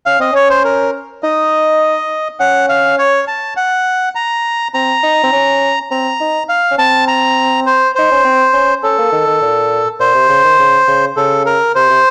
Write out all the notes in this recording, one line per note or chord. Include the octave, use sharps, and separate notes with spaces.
C#4 F5
C4 D#5
C#4 C#5
C5
A#4
D#4 D#5
C#4 F#5
F5
C#5
A5
F#5
A#5
C4 A#5
D#4
C4
C#4
C4 A#5
D#4
F5
C#4
C4 A5
A#5
C5
D#4 C5
C#4
C4
C#4
C#4 A4
A#3
D#3
D#3
A#2
A#2 C5
C3
C#3
D#3
C#3
C#3
C#3 A4
A#4
C3 C5
C3